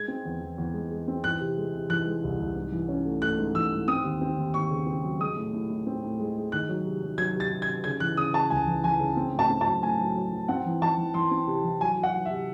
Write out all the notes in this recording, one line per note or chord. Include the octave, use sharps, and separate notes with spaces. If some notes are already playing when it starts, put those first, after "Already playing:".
Already playing: G#3 G#6
C4
E2
E2
E2
G#3
G#3
C4
E3 F#6
C3
G#3
C3
E3 F#6
G#3
C2
C2
G#2
E3
C#4
A3
A3 F#6
G#2
E3 E6
G#2
C4 D#6
D#2
C4
D#2
D#2 C#6
C#3
C4
F#3
G#3 D#6
A2
A2
A2
C4
A2
G#3
G#3
D#3 F#6
F#3
C3
F#3
F#3 G#6
C3 A6
C3
G#6
C3
C#3 G#6
E3 F#6
C#3 D#6
C#3 A5
C#2 G#5
E3
E3 G#5
C#3
C4
A2
A5
C4
A5
F#3
A2 G#5
F#3
F#3
F#3
C4 F#5
E3
E3 A5
E3
E3 C6
C4
C3
E3
F#3 G#5
F#3
F#5
F#3
E5
C3